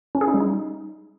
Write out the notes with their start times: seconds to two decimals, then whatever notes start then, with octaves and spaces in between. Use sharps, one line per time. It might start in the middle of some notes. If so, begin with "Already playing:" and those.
0.15 C#4
0.21 G#4
0.28 D#4
0.34 G3
0.40 D#4